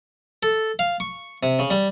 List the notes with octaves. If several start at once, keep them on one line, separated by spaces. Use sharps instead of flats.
A4
F5
C#6
C3
C#3
G3